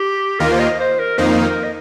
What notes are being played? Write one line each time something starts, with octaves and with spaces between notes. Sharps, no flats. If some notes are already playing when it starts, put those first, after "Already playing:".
Already playing: G4
D#2 D#3 A#3 F4 A#4
C5
D#5
C5
A#4
F2 D#3 A#3 D#4 C5
A#4
D#5